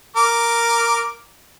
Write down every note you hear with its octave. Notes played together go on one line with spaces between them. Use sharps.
A#4 D6